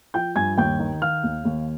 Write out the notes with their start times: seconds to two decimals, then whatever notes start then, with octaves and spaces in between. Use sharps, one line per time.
0.14 F3 G5 G6
0.36 G2 G#5 G#6
0.58 D#2 G5 G6
0.80 D#3
1.02 D#3 F5 F6
1.23 D#2
1.45 D#2